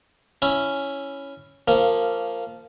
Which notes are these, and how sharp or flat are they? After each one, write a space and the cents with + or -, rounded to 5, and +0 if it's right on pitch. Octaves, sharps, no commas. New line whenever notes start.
C#4 +0 E4 +0
F3 +0 A#3 -15